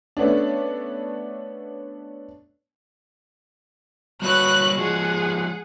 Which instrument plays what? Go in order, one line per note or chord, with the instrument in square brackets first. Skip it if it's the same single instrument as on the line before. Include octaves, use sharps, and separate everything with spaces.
[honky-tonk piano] A3 B3 C#4 D4
[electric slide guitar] G3 A#3 C#5 [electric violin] F#4 B4 [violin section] F#6
[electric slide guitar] F3 G#3 [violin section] G#4 [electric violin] F#5